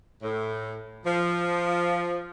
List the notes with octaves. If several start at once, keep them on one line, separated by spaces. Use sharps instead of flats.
A2
F3